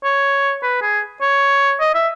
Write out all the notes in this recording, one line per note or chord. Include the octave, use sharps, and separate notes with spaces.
C#5
B4
G#4
C#5
D#5
E5